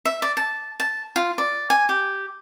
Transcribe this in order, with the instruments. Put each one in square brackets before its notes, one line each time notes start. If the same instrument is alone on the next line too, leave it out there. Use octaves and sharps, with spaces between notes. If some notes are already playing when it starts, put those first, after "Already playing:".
[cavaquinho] E5
D5
A5
A5
F4
D5
G#5
G4